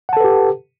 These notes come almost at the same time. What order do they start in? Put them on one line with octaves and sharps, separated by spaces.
F#5 A5 A4 B4 G4